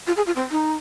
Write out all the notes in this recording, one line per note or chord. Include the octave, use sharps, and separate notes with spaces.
F4
G#4
F4
C4
D#4